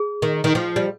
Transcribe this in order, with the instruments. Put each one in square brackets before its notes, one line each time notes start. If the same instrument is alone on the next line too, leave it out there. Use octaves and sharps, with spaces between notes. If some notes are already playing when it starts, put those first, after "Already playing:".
Already playing: [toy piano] G#4
[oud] D#3
D#3
F3
G3